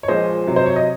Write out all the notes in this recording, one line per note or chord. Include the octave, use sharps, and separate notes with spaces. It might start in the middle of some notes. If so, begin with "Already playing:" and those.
C#5
A#2 F3 G#3 C5 D#5
C3 F#3
C5
C#5
D#5